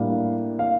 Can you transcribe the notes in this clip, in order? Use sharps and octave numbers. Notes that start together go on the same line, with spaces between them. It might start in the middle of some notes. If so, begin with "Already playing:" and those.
Already playing: A2 G3 A#3 D4 F5
F5